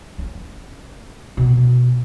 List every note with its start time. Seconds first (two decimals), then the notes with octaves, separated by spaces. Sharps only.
0.18 C#4
1.37 B2